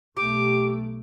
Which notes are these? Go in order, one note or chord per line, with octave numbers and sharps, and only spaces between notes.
B1 A3 G4 D6